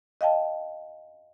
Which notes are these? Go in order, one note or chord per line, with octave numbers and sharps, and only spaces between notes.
D#5 F5 G5 A5